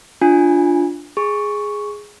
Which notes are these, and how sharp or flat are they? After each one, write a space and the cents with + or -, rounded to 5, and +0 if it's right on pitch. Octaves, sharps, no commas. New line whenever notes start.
D4 +0 F4 +0 G#5 -5
G#4 +0 C#6 +0